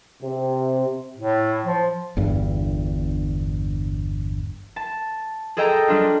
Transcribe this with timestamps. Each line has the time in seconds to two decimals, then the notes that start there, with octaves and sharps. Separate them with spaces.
0.22 C3
1.17 A2
1.65 F3
2.17 G1 E2 G2
4.76 A5
5.57 G#4 A4 D#5 G5 A5 A#5
5.88 G3 D4 F4